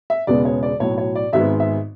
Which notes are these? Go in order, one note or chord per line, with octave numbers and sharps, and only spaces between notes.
E5
E1 E2 C#3 G#3 B3 D5
C#5
D5
B1 A2 F#3 C#5
C#5
D5
G#1 G#2 G#3 B3 E5
E5